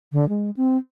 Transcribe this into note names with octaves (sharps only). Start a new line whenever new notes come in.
D3
G#3
C4